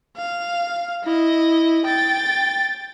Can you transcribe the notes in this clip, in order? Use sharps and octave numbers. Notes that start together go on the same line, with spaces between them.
F5
E4 D#5
G5 A6